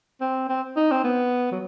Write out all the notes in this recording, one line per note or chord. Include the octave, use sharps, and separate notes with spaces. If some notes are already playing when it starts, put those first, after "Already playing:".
C4
C4
D#4
C4
B3
F#3